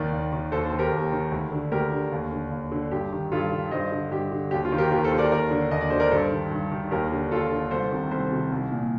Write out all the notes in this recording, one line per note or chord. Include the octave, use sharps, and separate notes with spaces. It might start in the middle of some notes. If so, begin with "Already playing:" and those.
Already playing: D#2 D#3 A#4 D5
D#2
D#3
D#2 A4 C5
A4 C5
D#3
G4 A#4
D#2
D#3
D2
D3
D2 G4 A#4
D3
D#2
D3
D#2
D3
G2 G4
D#3
G2 F4 A4
D#3
G2 C5 D#5
D3
G2 G4
D3
D#2 G4
F4
D#3
G4 A#4
D#2 G4 A#4
A4 C5
D#3
A#4 D5
D#2 A#4 D5
D3
D#2 D#5
D5
D3 C5
A#4 D5
G2 A4 C5
D#3
G2
D#3
D#2 G4 A#4
D3
D#2 F4 A4
D3
C2 A4 C5
C3 D#3
C2 A4 C5
C3 D#3
C2
A#2